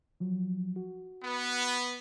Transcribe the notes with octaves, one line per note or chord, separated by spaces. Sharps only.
F3 F#3
F#4
B3